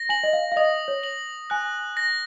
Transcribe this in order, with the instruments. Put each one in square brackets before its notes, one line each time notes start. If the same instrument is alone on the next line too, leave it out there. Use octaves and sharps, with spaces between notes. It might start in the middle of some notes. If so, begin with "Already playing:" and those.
Already playing: [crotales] A#6
[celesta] G#5 [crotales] F#7
[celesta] D#5
F5
F5
[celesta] D#5 [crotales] D#6
[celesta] C#5
[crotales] F#7
[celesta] G#5 [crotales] F#6
[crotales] A#6